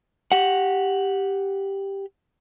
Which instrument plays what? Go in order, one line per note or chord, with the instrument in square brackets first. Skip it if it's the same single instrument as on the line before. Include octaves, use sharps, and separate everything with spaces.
[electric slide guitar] G4 F#5